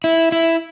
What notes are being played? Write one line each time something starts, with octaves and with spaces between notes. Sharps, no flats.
E4
E4